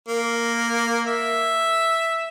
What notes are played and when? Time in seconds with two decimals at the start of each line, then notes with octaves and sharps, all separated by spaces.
0.08 A#3
1.07 E5